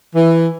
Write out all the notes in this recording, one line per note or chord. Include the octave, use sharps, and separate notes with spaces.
E3